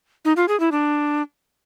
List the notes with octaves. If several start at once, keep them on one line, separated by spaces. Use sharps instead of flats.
D#4
F4
G#4
E4
D4